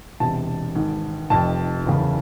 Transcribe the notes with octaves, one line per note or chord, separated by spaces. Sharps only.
E1 E2 C3 A5
G#1 G#2 D#3
F1 F2 C3 A5
F#1 E2 C#3